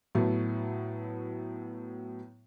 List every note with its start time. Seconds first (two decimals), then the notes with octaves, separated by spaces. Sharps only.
0.15 A2 F#3 A3 B3